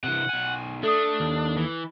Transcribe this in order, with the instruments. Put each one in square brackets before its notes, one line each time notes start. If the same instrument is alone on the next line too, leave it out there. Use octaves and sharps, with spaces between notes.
[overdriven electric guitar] C3 E3 [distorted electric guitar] F#5
[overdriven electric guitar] B1 G#5
[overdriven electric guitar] A3 [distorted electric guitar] D4 [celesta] A4 D#6
[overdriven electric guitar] D#2
[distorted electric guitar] E3